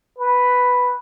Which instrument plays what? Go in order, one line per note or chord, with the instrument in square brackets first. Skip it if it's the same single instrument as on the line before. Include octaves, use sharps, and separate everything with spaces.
[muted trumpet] B4